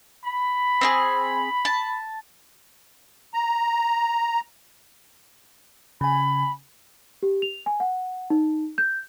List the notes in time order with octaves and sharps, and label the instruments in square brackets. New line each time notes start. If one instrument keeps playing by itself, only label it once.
[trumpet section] B5
[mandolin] C4 E4 G#4
A5
[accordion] A#5
[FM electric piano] C#3 G#5 [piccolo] B5
[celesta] G4
F7
G#5
F#5
D#4
G6